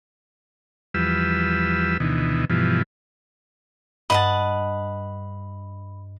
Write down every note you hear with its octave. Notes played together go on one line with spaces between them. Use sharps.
E2 F3 G3 B4 E6
D2 B2 D#3 E3
G2 B2 E3 F3
G2 D#5 F#5 A5 B5